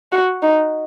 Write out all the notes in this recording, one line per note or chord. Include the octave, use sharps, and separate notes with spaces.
F#4
D#4